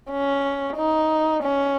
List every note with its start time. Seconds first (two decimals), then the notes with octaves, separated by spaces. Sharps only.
0.10 C#4
0.77 D#4
1.44 C#4